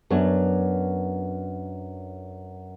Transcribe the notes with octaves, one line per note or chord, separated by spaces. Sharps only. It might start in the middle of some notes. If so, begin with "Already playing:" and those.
F#2 F#3 B3 D4 C#5